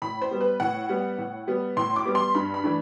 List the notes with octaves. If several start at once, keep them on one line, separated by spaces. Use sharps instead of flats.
A2 B5
C5
G3 B3
B4
A2 F#5
G3 B3
A2
G3 B3
A2 C6
D6
G3 B3
C6
G2 B5
B5
E3 A3 D4